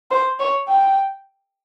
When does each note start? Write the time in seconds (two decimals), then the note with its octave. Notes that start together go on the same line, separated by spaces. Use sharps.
0.11 C5
0.39 C#5
0.68 G5